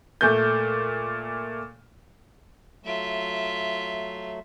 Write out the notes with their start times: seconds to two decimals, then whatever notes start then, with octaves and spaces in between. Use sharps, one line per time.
0.21 A#2 A3 G6
2.85 F#3 A3 F4 E5